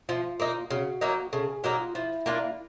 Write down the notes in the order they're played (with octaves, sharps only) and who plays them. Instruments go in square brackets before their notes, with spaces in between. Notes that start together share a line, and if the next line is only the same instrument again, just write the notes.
[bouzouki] F3 [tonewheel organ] F4
[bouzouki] A#3 D#4
[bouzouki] C#3 [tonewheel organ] F#4
[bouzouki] F#3 A#3 D#4
[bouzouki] C#3 [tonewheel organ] A4
[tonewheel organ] G#4
[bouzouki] F#3 A#3 D#4 [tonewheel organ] F#4
[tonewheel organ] F4
[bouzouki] F3 [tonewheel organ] E4
[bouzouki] A#3 D4 F4